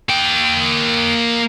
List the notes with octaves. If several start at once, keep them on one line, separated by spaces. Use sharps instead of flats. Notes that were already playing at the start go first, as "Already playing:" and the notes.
A#3 G5